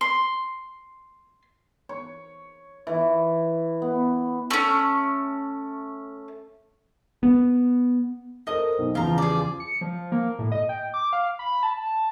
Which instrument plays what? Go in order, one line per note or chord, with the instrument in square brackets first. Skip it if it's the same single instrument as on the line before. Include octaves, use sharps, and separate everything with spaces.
[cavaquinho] C6
[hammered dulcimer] C#5
E3
B3
[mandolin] A3 C#4
[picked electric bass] B3
[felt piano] A4 A#4 C5 [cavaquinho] D#5 D#6
[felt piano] B1
[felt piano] E2 C#3 E3 [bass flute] F3 [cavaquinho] F4 A#5
[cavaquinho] G#4 D5
[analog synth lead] C#7
F3
A#3
A2
D#5
G5
D6
F5
B5
A5